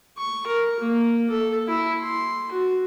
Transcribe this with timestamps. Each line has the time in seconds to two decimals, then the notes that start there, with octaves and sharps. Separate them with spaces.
0.18 C#6
0.47 A#4
0.80 A#3
1.30 A4
1.68 E4
2.00 C6
2.52 F#4